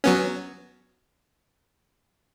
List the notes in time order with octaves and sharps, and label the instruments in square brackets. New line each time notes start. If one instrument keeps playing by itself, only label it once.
[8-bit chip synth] F#3 B3 C#4